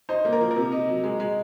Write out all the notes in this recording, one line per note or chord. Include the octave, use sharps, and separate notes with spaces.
D#4 C5
A#3
A#4
F3
A#4
C3
D#4
F#3
G#3
G#3